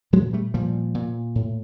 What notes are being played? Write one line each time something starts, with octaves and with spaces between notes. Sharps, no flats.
A#2 F#3 G#3
G3 A3
A#2 F3 G3
A#2
A2